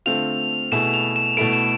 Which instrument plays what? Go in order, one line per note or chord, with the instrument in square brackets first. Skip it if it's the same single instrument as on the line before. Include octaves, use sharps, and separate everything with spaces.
[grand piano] D3 A3 C4 F4 [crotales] F7
[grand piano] B2 A3 E4 G#4 [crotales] E7
[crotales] F7
E7
[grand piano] B2 A3 E4 A4 [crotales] D7
[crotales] E7